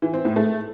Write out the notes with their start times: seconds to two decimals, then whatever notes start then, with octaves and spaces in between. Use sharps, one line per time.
0.02 E3
0.14 C4
0.25 A2
0.36 A3